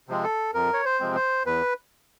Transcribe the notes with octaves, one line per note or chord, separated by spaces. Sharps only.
C3 F3 G#3 C4
A4
F2 A#4
C#5
C5
C3 F3 G#3 C4
C5
E2 B4